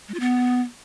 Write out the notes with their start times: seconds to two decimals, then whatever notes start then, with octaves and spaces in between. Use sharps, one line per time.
0.08 G#3
0.14 F4
0.20 B3